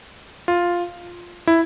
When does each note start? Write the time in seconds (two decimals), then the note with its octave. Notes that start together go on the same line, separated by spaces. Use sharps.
0.48 F4
1.47 E4